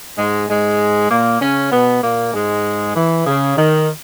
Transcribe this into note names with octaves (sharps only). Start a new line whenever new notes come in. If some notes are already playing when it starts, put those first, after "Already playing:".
G#2 G#3
G#2 G#3
A#2 A#3
C#3 C#4
B2 B3
A#2 A#3
G#2 G#3
E3
C#3
D#3